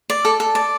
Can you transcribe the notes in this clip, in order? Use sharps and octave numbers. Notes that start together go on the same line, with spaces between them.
D5
A4
A4
D5